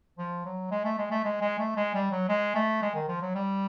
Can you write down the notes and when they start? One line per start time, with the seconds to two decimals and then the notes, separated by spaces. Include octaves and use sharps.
0.19 F3
0.45 F#3
0.71 G#3
0.84 A3
0.98 G#3
1.11 A3
1.24 G#3
1.41 G#3
1.59 A3
1.76 G#3
1.95 G3
2.11 F#3
2.29 G#3
2.55 A3
2.82 G#3
2.95 D#3
3.08 F3
3.21 F#3
3.35 G3